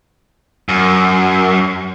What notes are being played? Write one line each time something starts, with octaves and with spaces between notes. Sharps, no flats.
F#2